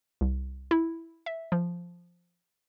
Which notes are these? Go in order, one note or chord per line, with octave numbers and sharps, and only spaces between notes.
C2
E4
E5
F3